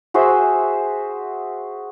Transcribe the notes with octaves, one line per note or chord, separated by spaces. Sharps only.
F#4 G#4 C5 E5